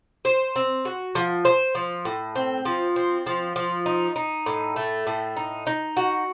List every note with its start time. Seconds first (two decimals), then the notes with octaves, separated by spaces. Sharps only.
0.25 C5
0.56 C4
0.85 F#4
1.15 F3
1.45 C5
1.75 F3
2.05 A2
2.35 C4
2.65 F3
2.96 C4
3.26 F3
3.56 F3
3.86 D#4
4.16 D#4
4.46 A2
4.76 A3
5.07 A2
5.36 D#4
5.67 D#4
5.97 F#4